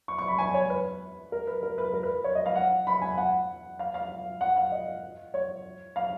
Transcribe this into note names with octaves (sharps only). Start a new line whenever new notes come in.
C#6
C#6
B5
G#5
C#5
B4
A#4
B4
A#4
B4
A#4
B4
C#5
D#5
F5
F#5
B5
G#5
F#5
F5
F5
F#5
F5
D#5
C#5
F5